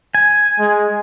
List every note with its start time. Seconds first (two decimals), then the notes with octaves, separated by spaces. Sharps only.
0.15 G#5
0.59 G#3